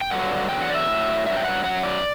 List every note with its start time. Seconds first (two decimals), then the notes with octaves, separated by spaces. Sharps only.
0.01 G5
0.11 G2 D3 F#3 F#5
0.49 E2 D3 F#3 G5
0.62 F#5
0.70 D5
0.75 E5
0.88 A2 F#3
1.26 G2 F#3 E5
1.37 G5
1.45 F#5
1.64 F#2 F#3 F#5
1.83 D5